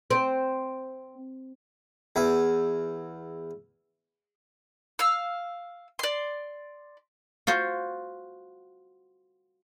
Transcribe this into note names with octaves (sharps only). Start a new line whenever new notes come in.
C4
E2 E5
F5 E6
D5 C6
F4 F#4 C5 C6